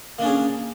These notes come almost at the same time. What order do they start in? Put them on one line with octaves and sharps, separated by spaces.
A#3 D4 C#4 G#4